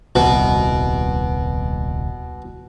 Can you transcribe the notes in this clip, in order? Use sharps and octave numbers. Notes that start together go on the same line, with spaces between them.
D#1 C2 B2